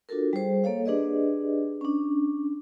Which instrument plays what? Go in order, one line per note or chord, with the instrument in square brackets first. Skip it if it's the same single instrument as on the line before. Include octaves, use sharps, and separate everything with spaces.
[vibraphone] D4 F4 F#4 A4 A#4
G3 G#4 C5
A#3 A4 C#5 F5
D4 G4 G#4 B4 D5 D#5
C#4 D4